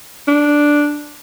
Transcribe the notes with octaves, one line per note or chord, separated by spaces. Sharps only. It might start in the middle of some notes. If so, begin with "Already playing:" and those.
D4